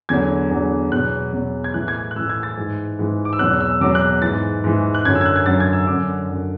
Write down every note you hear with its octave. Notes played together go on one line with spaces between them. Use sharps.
E2 D3 F#3 G#6
E2 D3 F#3
E2 B2 F#3 F#6
E2 B2 F#3
G#6
A2 E3 F#6
G#6
F#6
A2 E3 E6
G#6
A6
G#2 E3
G#2 E3
D6
E6
E2 B2 F#3 F#6
E6
E2 B2 F#3 D6
F#6
G#2 E3 A6
G#2 E3
F#6
F#2 D3 F#3 G#6
E6
G#6
F#6
G#6
F#2 D3 F#3 A6
G#6
E6
F#2 D3 F#3 D6
F#2 D3 F#3